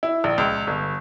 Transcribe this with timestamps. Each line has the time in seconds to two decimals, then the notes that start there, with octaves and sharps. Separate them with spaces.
0.03 E4
0.24 A#1
0.38 C#2
0.67 G1